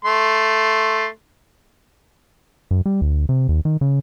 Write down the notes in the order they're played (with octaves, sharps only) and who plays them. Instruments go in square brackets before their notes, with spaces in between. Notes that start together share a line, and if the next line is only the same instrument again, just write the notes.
[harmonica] A3 C6
[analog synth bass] F#2
G3
D2
C3
D#2
D#3
C#3